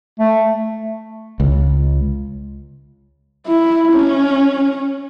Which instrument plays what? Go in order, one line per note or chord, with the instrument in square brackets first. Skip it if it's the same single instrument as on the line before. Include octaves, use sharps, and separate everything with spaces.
[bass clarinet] A3
[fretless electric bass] C#2
[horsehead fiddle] E4
C#4